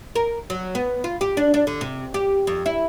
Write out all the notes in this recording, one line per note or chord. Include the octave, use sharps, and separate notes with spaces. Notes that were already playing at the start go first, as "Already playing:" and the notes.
A#4
F#3
B3
F4
G4
D4
D4
D3
C3
G4
F2
E4